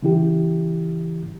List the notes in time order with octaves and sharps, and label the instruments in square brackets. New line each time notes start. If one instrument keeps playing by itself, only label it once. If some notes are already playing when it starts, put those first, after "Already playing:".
[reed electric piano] C#3 E3 E4 G4